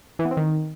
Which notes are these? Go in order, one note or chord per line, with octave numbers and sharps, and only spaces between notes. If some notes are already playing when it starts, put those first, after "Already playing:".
E3
B3
C4
D#3